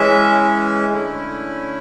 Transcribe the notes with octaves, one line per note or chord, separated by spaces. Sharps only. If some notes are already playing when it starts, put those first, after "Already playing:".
Already playing: E3 G#3 C#4 E5
D3 A3 C#4 E4